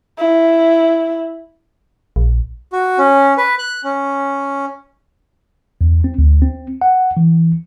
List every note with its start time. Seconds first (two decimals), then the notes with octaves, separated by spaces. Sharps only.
0.18 E4
2.16 A#1
2.73 F#4
2.98 C#4
3.38 B4
3.59 F#6
3.84 C#4
5.81 E2
6.04 C4
6.18 D2
6.42 C4
6.81 F#5
7.17 E3